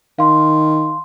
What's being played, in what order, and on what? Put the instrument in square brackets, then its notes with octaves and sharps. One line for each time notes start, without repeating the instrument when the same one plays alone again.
[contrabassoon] D#3 [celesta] F5 C6